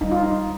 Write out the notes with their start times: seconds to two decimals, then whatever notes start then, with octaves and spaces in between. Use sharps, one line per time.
0.01 G3 D#4
0.12 F4
0.23 D#4